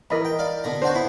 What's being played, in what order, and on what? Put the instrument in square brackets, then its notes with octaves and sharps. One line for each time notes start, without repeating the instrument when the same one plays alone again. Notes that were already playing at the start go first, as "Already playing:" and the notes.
[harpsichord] E3 [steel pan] A#4 D#5 B5
[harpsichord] G5
D5 F5
B2 D3 A#5
[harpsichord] D4 F#4 C#5 [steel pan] C5
[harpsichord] B3 E4